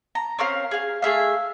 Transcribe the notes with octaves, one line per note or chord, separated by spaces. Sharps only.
A#5
C4 C#4 A#4 F5
G#4 F5
A3 G#4 E5 F5